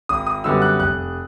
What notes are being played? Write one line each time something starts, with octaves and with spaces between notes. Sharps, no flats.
G#1 D#6
D#6
F#2 D3 G3 B3 E6
F#6
F1 F#6